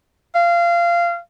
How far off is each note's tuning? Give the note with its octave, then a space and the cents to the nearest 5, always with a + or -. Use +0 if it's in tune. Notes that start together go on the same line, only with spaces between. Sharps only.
F5 -20